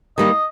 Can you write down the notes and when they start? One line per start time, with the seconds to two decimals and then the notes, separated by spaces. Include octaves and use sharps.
0.17 D#3 G3 A#3 D#5